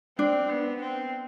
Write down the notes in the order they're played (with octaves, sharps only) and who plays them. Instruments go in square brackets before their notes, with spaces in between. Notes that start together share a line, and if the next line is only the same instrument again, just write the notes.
[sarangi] C4 [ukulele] D4
[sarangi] B3
C4